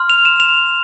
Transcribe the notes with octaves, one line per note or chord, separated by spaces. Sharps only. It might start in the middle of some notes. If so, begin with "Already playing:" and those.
Already playing: C6 F6
F7
E7
F7